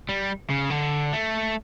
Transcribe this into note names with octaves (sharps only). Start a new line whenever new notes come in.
G3
C#3
D3
A3